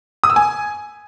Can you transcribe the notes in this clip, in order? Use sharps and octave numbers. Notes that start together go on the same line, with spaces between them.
D#6
E6
G#5